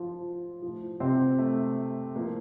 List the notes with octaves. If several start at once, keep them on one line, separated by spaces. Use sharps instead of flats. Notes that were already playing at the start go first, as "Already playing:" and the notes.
Already playing: F3 F4
F3
A2
C3 C4
A3
A2 F3 A#3